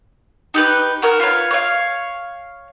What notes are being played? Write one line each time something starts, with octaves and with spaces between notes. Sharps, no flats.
D#4 G4 B4
F#4 A#4 F6
F4 B4 C#5
C#5 F5